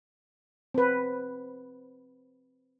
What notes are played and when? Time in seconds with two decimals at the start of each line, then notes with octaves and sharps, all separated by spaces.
0.74 C4 B4